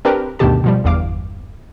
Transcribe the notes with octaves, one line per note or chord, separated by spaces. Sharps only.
C4 D4 G4 A#4 B4
D2 G2 B2 D#3 G4 A5
B2 F3 G3
G1 E2 G2 F5 D6